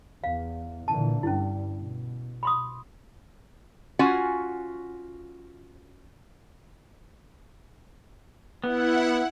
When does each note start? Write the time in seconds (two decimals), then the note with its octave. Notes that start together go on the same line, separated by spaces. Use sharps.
0.24 E2 F5
0.88 A#2 D3 E3 A5
1.23 G2 G3 C#4 E4
1.76 B2
2.43 B5 C6 D#6
3.99 C#4 F4 F#4 F#5 G#5
8.64 B3 E4 F#5